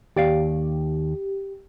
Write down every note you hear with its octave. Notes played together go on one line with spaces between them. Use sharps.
D#2 G4 D5 F5